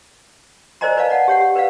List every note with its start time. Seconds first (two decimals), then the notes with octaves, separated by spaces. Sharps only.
0.81 A#4 C5 D5 D#5 G#5 A#5
0.97 A#4 B4 D5 D#5 F5 A5
1.10 D5 F#5 A5
1.28 G4 C#5 F#5
1.41 G4
1.55 A#4 B4 D5 F5